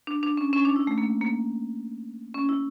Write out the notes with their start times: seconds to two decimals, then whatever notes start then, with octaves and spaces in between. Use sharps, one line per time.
0.07 D4
0.23 D4
0.37 C#4
0.53 C#4
0.65 D4
0.76 E4
0.87 A3
0.98 A#3
1.21 A#3
2.34 C#4
2.49 E4